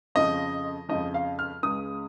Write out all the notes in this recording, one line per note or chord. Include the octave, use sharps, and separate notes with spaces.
F2 C#3 F3 D#5
F2 C#3 F3 D#5
F5
F6
C#2 C#3 G#3 D#6